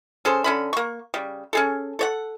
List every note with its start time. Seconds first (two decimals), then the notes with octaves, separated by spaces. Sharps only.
0.25 C#4 G#4 A4 C5
0.44 D3 C#4 B5
0.73 A#3 C#6
1.14 C#3 G3
1.53 C#4 G#4 A4
1.99 A4 C#5 F#5